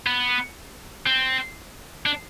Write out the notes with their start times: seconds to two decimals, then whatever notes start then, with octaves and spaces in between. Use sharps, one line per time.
0.06 B3
1.07 C4
2.06 D4